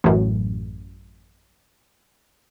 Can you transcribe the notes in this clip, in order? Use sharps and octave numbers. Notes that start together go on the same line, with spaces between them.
A1 F#2